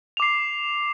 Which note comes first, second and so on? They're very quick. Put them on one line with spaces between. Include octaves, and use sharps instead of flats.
F7 D6 C7